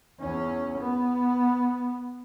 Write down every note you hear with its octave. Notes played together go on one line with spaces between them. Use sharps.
E2 C#4
B3